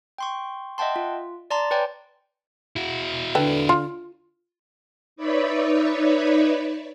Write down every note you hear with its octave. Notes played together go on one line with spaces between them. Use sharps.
G5 C6 C#6
D#5 E5 F#5 G5 A5 C6
F4
D5 A5 A#5 C6 A6
B4 C#5 D5 G5 G#5
E4 F#4
D3 A4 B4 G5
F4
D#4 B4 C#5 D5 E5 B5